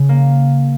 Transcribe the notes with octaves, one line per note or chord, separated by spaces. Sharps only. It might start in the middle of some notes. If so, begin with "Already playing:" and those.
Already playing: C#3
A#3